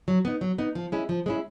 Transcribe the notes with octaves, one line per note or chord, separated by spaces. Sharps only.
F#3
B3 D#4
F#3
B3 D#4
F3
G#3 C#4 E4
F3
G#3 C#4 E4